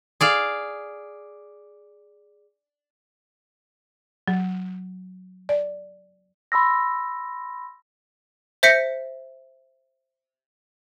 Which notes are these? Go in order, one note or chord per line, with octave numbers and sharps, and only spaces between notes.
G#4 D5 F5
F#3
D5
B5 C6 E6 A#6
C5 E5 G6 A#6 B6 C#7